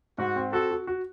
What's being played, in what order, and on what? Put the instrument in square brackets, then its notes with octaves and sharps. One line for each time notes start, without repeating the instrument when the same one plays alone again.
[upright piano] G#2 [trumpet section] F#4
[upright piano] C4
[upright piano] F#4 [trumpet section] A4
[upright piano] F#4
F#4